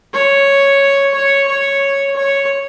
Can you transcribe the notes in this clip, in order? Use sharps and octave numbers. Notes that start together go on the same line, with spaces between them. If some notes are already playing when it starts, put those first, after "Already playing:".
C#5
C#5
C#5
C#5